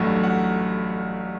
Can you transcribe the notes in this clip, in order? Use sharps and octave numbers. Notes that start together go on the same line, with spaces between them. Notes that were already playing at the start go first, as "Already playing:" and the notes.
Already playing: A1 G2 F#3 A3 F#5
F#5